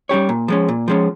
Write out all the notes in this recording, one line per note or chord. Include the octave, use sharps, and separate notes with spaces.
G3 C#4 G4 C#5
A#2
F3 G#3 C#4
A#2
F3 G#3 C#4